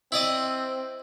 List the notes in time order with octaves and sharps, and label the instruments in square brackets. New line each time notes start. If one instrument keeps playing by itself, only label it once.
[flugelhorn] C4 [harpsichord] E4 D5 D#5